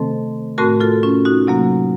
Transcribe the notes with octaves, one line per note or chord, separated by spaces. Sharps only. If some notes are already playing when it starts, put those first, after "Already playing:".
Already playing: C3 D#3 A3 C4 A4 C5
A2 A3 C4 F#4 A#4
F4 A4
C#4 F4
D#4 F#4
C3 F#3 A#3